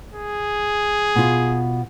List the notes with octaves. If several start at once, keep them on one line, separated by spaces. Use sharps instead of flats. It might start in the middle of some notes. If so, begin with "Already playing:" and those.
G#4
B2 F4